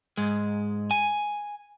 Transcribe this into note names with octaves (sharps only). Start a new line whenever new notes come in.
G#2 G#3
G#5